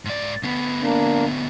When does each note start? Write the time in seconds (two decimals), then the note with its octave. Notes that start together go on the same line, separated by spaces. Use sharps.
0.05 G#2 D5
0.43 D2 B3
0.81 A#3 D4